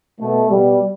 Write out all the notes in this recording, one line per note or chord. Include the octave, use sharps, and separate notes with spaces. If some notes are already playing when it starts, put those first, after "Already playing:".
B2 A3
B2 G3